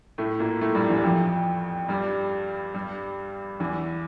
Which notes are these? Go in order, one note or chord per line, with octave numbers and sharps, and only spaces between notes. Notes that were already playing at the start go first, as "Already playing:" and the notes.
A2 A3
A#2 A#3
A2 A3
G2 G3
E2 E3
F2 F3
G2 G3
G2 G3
E2 E3